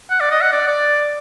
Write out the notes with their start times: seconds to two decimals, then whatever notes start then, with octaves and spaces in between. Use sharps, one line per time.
0.10 F#5
0.20 D5
0.31 D#5
0.42 F#5
0.53 D5
0.68 D5